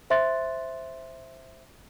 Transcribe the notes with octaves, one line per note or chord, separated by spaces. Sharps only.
C5 E5 C6 F#6 A6